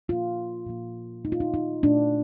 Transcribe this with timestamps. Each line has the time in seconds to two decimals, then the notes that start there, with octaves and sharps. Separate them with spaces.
0.09 A#2 F3 A#3 F4
0.66 A#2 F3 A#3
1.25 A#2 A3 D#4
1.32 F4
1.40 D#4
1.54 D#4
1.83 A#2 A3 D4